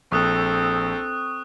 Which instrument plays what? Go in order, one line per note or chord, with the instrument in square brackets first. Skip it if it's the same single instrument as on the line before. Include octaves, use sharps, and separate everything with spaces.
[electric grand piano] A#1 [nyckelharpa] C4 A4 [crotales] C#6 D#6 F#6